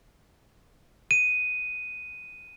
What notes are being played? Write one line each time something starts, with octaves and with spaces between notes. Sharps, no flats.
D#7